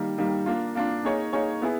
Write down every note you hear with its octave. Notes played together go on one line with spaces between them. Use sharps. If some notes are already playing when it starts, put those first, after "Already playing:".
Already playing: D#3 G3 A#3
D#3 G3 A#3
A#3 D4 F4
A#3 D4 F4
A#3 D#4 G#4 C#5
A#3 D#4 G#4 C#5
B3 E4 G#4